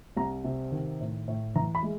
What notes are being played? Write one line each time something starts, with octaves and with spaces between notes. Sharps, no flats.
C2 A#5
C3
D#3
A2
A2
E3 A#5
B5
G#3